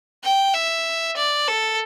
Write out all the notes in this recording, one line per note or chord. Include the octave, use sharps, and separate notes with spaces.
G5
E5
D5
A4